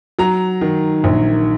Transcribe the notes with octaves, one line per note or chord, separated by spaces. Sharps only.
F#3 A#5
D#3
A#1